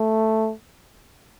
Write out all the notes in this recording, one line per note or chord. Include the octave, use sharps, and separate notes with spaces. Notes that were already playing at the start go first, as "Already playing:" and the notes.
Already playing: A3